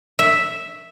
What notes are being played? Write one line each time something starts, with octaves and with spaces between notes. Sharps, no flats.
E5